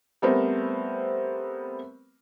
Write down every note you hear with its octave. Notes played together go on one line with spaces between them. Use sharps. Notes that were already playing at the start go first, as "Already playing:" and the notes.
G3 A3 B3 C4 A#4 C5